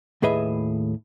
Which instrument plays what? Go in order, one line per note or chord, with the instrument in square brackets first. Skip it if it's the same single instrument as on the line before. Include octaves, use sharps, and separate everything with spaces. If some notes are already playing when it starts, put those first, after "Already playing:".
[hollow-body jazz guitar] D#2 A2 G#4 B4 D#5 E5